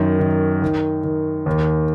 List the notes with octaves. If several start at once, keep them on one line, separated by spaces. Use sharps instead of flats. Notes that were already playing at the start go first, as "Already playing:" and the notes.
Already playing: F#2 D#3
D#3
D#3
D#3
D#2